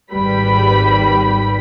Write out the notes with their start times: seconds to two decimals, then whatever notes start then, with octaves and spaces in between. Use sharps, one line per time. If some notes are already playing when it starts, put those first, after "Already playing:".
0.13 G#1 G3 B4 G5 B5 B6